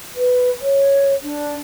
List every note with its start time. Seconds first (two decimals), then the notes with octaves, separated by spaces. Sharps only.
0.15 B4
0.61 C#5
1.23 D4